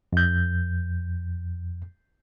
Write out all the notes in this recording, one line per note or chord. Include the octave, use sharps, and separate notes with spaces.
F2 G6